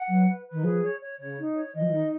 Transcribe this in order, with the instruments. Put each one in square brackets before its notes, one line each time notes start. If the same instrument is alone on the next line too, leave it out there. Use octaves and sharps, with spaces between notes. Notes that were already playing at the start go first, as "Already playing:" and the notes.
Already playing: [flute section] F#5
[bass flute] F#3 [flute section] B4
[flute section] B4
B4
[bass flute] D#3
[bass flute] F3 [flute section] G#4
[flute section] C#5
C#5
[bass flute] C#3 [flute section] C#5
[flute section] D#4
C#5
[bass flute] D#3 [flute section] D#5
[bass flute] F3
[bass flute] D#3 [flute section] D#4